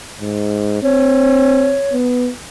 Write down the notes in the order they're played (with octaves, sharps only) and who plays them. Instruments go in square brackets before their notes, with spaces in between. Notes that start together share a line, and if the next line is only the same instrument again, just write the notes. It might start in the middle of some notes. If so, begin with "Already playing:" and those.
[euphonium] G#2
[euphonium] C4 [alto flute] C#5
[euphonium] B3